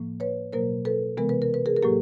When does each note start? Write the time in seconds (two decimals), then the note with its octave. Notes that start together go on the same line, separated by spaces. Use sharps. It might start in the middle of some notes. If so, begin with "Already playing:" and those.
Already playing: A2 F3 A#3
0.20 B4 C#5
0.53 B2 F#3 A#3 A#4 C5
0.85 A4 B4
1.17 C3 E3 G#3 B3 A#4
1.29 B4
1.42 A#4
1.54 B4
1.66 G#4 A#4
1.76 A#4
1.83 A2 F#3 A#3 G4 A4